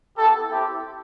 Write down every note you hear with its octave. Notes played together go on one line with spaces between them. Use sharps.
B3 E4 G4 A4
C4 E4 G4